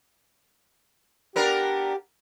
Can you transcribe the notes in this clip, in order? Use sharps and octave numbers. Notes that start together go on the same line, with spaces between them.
B3 D4 G4 A#4